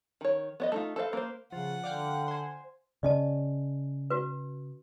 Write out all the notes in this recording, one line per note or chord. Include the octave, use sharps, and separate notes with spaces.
D#3 C#5
B3 C#5 D#5
A3 D#4 F4
A4 B4 C5 D5 F5
A#3 B4 C5
C#3 F3 F#5
D3 D5 F5 G5
C5 G#5
C#3 C#4 D5 D#5 A5
F#4 B4